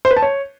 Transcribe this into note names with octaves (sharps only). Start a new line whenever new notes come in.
C5
B4
A5
C#5